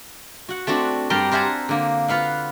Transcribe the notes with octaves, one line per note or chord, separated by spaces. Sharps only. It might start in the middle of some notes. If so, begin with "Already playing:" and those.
F#4 F#5
A3 C4 D4 F#4
G2 G3 G4 A#4 G5 C6
A#4 C5 E5 F#5 G#5 A5
D3 A#3
F4 B4 F5 F#5